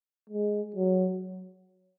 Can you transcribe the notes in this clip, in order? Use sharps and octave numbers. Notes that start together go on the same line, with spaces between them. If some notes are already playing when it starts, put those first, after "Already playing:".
G#3
F#3